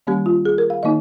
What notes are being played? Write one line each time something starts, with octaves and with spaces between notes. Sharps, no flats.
D#3 G3 A#3 C#4 G4
F4
G#4
A#4
F5
D#3 A#3 D#4 D#5